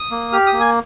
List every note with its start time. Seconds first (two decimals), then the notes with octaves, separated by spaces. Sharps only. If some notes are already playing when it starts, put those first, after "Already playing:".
Already playing: D#6
0.11 A#3
0.32 G4 F6
0.47 D#6
0.53 A#3
0.60 G#5